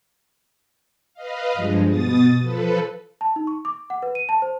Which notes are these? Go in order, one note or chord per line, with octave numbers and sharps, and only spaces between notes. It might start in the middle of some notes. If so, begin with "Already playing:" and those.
B4 D#5 F5
G2 F3 G#3
B2 D#6 A6
F3 A4 B4
A5
D#4
C#6
D6
F#5
B4
D#7
A5
C5